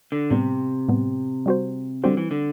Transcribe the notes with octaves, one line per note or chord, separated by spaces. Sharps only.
D3
A2 C3 G3 B3
A2 G3 B3
G3 C4 F#4 C5
D3 G3 C4 F#4 C5
E3
D3